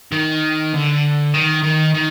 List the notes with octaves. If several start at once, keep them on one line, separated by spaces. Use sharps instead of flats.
D#3
D3
D#3
D#3
D#3